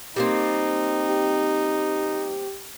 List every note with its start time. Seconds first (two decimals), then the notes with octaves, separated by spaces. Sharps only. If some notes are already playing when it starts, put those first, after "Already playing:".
0.16 G3 A#3 C4 D#4
1.08 G4